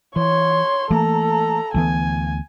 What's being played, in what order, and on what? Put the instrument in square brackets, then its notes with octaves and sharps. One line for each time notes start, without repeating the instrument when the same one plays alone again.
[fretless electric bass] E3 [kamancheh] C#5 C6
[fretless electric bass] E3 A3 A#3 [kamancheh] A4 A#5
[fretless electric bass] D2 E3 B3 [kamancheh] G#5